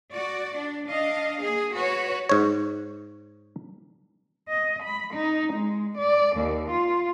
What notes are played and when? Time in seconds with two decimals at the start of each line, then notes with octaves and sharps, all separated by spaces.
0.12 F#4 D5
0.55 D4
0.89 D4 D#5 F5
1.41 A#3 G#4
1.74 F#4 B4 C#5
2.29 G#2 C#5
4.48 D#5
4.83 B5
5.13 D#4
5.52 G#3
5.97 D5
6.37 D#2
6.71 F4